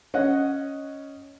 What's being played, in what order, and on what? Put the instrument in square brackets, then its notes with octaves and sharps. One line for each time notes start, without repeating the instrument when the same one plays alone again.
[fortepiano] C#4 D#5 F#5